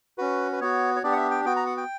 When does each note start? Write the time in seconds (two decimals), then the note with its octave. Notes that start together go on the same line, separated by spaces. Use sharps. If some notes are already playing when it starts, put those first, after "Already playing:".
0.18 C#4 F#4 B4
0.53 B4
0.61 B3 F#4 C#5
0.96 C#5
1.03 B3 D4 G4 D5
1.12 F#5
1.17 E5
1.31 G5
1.45 B3 F#4 G5
1.56 A#5
1.66 F#5
1.77 G5